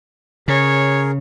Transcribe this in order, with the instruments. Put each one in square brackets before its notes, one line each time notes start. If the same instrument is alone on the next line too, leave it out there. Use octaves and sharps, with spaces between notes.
[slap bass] C#3 [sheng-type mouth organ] G#4 A#4 [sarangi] C#5